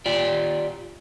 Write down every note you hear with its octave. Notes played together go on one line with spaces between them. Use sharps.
F4 G4 D5